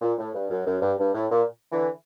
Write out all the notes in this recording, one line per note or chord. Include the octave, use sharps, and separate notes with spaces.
A#2
A2
G2
F#2
F#2
G2
G2
A2
A#2
D3 E3